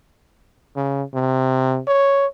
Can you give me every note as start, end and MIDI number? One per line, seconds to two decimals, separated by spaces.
0.76 1.03 49
1.14 1.80 48
1.87 2.26 73